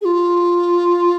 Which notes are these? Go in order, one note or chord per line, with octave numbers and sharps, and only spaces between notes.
G#4
F4